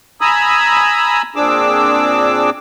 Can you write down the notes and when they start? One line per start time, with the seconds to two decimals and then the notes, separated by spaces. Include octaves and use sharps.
0.21 G#5 A#5 B5 D#6 E6
1.36 A#2 C4 D4 G#4 D6 E6